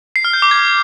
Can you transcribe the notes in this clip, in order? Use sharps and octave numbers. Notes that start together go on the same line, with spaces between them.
C7
F6
G6
D6
G#6